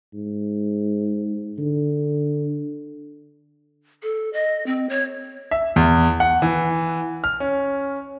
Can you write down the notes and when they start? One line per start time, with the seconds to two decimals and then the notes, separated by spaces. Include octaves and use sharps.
0.14 G#2
1.59 D3
4.03 A4
4.33 D#5
4.66 C4
4.89 C#5
5.51 E5
5.76 E2
6.20 F#5
6.42 E3
7.24 F6
7.40 C#4